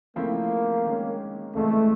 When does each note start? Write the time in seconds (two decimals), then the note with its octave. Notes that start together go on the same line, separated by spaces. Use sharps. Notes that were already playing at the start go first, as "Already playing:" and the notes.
0.16 C#3 F3 A3 A#3 C4 E4
0.85 D#3 G#3 C#4
1.54 C#2 C#3 E3 G#3 A3 C4